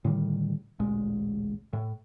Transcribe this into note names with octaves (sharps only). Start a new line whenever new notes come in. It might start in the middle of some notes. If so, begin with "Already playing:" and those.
A2 D3 D#3 G3
A1 D2 A#2 G#3
A2